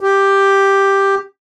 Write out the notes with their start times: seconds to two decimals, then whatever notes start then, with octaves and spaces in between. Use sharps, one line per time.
0.01 G4